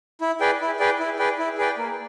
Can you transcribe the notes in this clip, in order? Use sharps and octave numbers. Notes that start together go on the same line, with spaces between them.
E4
G#4 B4 D5 G5
E4
G#4 B4 D5 G5
E4
G#4 B4 D5 G5
E4
G#4 B4 D5 G5
A#3